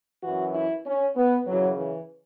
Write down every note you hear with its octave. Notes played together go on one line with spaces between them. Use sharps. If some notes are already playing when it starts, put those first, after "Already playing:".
F#2 E3 F#4
E4
C#4
B3
F#2 C#3 E3 F#3
E3